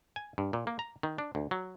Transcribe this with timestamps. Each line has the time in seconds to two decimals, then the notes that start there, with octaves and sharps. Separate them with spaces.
0.16 G#5
0.38 G2
0.53 A#2
0.67 A#3
0.79 A#5
1.03 D#3
1.18 D4
1.35 D2
1.51 F#3